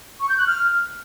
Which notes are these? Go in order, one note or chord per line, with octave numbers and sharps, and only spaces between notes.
C#6
G6
F#6
F6